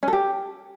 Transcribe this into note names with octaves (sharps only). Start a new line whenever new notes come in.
C#4
A4
G4